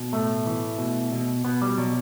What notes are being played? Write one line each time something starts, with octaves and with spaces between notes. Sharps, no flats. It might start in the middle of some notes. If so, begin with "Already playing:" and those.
Already playing: B2
A2 A3
E3
B2
B2
B2 B3
G3
B2 F#3